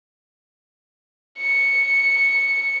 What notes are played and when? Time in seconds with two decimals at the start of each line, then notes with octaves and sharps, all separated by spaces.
1.40 C#7